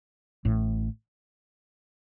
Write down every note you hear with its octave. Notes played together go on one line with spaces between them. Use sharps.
A1 A2